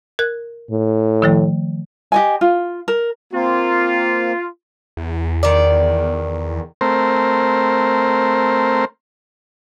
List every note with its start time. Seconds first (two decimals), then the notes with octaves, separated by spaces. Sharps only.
0.19 A#4 F#6
0.70 A2
1.22 D#3 F3 A3
2.12 G4 D#5 G#5
2.41 F4
2.88 A#4
3.33 A#3 C4 F4
4.97 E2
5.43 D#3 D5
6.81 A3 C4 A#4 C5